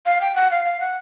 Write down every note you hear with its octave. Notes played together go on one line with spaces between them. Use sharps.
F5
G5
F#5
F5
F5
F#5